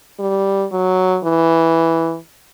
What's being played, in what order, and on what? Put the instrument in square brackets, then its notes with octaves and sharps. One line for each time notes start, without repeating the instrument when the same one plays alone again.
[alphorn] G3
F#3
E3